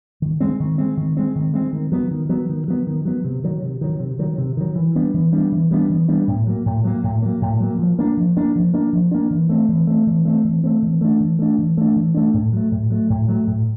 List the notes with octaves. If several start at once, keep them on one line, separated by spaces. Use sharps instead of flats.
D#3
G#3 C4
D#3
G#3 C4
D#3
G#3 C4
D#3
G#3 C4
D#3
F#3 B3
D#3
F#3 B3
D#3
F#3 B3
D#3
F#3 B3
C3
D#3 F#3
C3
D#3 F#3
C3
D#3 F#3
C3
D#3 F#3
E3
G3 B3 D4
E3
G3 B3 D4
E3
G3 B3 D4
E3
G3 B3 D4
A2
F#3 A#3
A2
F#3 A#3
A2
F#3 A#3
A2
F#3 A#3
F3
A#3 D4
F3
A#3 D4
F3
A#3 D4
F3
A#3 D4
E3
A3 C4
E3
A3 C4
E3
A3 C4
E3
A3 C4
E3
A3 D4
E3
A3 D4
E3
A3 D4
E3
A3 D4
A2
F#3 A3
A2
F#3 A3
A2
F#3 A3
A2